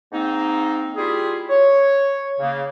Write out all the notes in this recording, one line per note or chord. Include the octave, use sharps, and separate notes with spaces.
G#2 A#3 C4 D#4
G3 E4 F4 G4 G#4
C#5
C#3 A#3